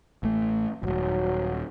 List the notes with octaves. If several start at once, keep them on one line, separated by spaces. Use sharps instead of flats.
A1 A3
D#1 G#1 F#3